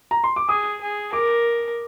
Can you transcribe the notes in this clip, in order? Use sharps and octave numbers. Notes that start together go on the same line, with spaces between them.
A#5
C6
D6
G#4 D#6
G#4
A#4 D6